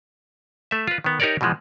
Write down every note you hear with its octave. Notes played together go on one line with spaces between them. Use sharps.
A3 E5
F4 B4
D#3 B3
D#4 G4 A#4 C#5 D5
B2 E3 F3 G#3